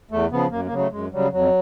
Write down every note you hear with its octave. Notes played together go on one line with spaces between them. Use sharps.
E2 A3
C#3 F3 B3
F#2 A#3
A#3
C#3 F#3
A3
F#2 G#3
C#3 F#3 G3
F2 F#3